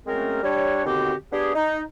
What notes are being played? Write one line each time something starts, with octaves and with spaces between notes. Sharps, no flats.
F#3 G#3 A3 C4 C#4 A#4
G3 D4 C#5
D#2 B2 D3 C4 F#4 G4
B3 D4 G4 G#4
D#4